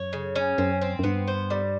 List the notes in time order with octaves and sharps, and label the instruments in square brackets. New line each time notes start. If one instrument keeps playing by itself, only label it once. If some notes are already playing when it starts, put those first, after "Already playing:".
Already playing: [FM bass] F#2 [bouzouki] C#5
[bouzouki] C#3
C#4
[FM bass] F#2 [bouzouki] C4
[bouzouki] C4
[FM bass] F#2
[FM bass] G2 [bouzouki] B3
[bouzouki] C5
G3